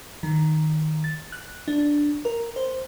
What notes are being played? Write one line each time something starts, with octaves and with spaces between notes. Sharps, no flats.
D#3
A6
F#6
D4
A#4
C5